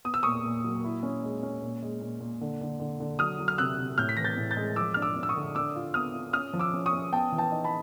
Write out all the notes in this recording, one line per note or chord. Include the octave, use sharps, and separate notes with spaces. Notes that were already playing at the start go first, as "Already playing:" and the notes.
B3 D#6
E6
A#2 C#6 D#6
A#2
F#3
E4
C#4
G#3
C#4
A#2
G#3
A#2
A#2
D3
D3
D3
D3
F#3 D#6 F6
F#3
F6
C3 E6 F#6
C3
A2 F6 G6
B6
E3 A#6
G6 A6
A2
G6 A6
G#3
F3 D6 E6
D4 F6
D6 E6
D4
E6
C#6 D#6
D3
D4 D6 E6
F4
B3 D#6 F6
F4
C#4 D#6 F6
F3
D6 E6
C#4
C#6 D#6
C#4
B3 G5 A5
E3
G5 A5
D#4
A5 B5